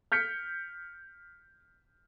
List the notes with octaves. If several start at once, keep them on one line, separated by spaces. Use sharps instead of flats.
F6 G6 B6 C#7